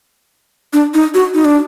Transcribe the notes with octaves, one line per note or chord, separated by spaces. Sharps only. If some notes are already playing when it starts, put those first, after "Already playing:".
D4
D#4
F#4
D#4
D4